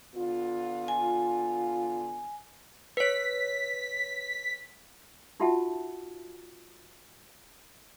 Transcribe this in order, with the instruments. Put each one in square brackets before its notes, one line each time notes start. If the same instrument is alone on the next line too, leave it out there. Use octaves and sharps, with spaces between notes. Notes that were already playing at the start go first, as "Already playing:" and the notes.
[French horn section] D3 B3 F4
[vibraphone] G#5
[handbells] B4 C#5 [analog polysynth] B6
[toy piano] D#4 F4 F#4 E5 F#5 A5